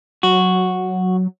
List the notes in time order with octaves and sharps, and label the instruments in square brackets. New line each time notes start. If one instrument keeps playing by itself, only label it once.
[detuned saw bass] F#3 [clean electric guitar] F#4